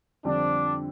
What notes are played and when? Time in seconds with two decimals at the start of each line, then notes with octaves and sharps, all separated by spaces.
0.24 F2 D3 G3 C4 D4